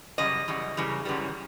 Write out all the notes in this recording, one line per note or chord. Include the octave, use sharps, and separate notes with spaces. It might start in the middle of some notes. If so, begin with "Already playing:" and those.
F#2 C#3 G3 D#5
F#2 C#3 E3 G3
F#2 C#3 E3 G3
F#2 C#3 E3 G3